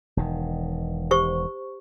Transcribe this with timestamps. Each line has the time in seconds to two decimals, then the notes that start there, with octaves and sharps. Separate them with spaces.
0.17 E1 D#3
1.11 G4 C5 C#6